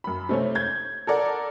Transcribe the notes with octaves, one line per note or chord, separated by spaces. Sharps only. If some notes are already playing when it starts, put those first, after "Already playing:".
F#2 B5
C3 A3 C4 C#4
G6 G#6
A4 A#4 D5 F#5